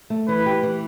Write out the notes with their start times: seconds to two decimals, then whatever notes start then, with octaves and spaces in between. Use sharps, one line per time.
0.10 A3
0.28 E3 B4
0.46 G4
0.63 E3